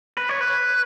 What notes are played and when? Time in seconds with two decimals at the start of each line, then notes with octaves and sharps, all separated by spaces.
0.17 B4
0.29 C#5
0.41 B4